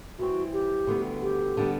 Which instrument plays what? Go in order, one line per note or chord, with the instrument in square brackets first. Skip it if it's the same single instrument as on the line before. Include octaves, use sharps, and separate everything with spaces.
[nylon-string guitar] E3 G3 C4 [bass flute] F#4
[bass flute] G4
[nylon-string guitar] D2 D3 G3 B3
[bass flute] G4
[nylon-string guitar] D3 G3 B3